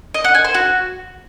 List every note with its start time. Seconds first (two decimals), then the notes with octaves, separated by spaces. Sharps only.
0.14 D#5
0.24 F#5
0.34 G#5
0.45 C5
0.55 F#4